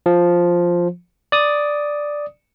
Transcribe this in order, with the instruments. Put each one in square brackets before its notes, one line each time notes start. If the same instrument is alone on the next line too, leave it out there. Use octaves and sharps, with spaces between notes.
[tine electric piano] F3
D5 D#6